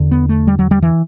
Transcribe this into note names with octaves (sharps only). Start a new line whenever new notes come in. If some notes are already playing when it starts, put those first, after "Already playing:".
Already playing: E2 D3
B3
A3
G3
F#3
G3
E3